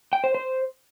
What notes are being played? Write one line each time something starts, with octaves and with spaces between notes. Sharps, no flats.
G5
C5
C5